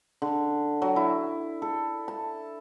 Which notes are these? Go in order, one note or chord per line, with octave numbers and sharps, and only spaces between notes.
D3
F#3
E4
A4
A5